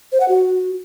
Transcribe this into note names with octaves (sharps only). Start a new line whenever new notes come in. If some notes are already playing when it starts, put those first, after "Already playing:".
C5
F#5
F#4